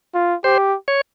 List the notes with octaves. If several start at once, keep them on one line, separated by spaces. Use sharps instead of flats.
F4
G4 C5
C#5